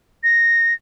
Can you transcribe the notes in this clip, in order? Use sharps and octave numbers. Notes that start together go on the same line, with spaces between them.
A#6